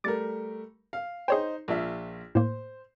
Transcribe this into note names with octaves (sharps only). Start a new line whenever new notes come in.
G3 A3 A#4 D6 A6
F5
D#4 G#4 C5 C#5 G5
A#1 F4 E5
A2 A#3 C5